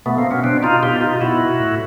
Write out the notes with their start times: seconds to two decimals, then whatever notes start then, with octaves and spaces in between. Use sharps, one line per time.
0.06 B2 A3 B3
0.18 A#3 C4
0.31 B3 C#4
0.44 B2 C4 D4
0.63 D#4 F4
0.83 B2 F4 G4
1.01 D#4 F4
1.16 F4
1.21 B2 E4 F#4
1.59 A2